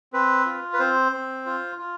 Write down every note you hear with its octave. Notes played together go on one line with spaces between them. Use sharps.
C4 B4
F4
B4
C4 C5
C4
F4
F4